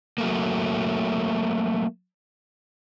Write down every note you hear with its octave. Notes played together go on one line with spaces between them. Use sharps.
F#3 A3 A#3